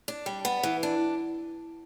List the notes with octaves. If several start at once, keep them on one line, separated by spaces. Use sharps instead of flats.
D4
G3
B3
E3
D4